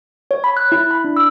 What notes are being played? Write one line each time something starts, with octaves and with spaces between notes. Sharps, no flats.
C#5
B5
F#6
E4
B5
D4
E6